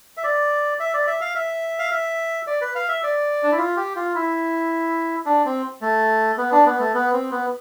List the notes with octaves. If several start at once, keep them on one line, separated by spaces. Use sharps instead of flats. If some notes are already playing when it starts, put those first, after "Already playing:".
E5
D5
E5
D5
E5
F5
E5
F5
E5
D5
B4
F5
E5
D5
D4
E4
F4
G4
F4
E4
D4
C4
A3
B3
D4
B3
A3
B3
C4
B3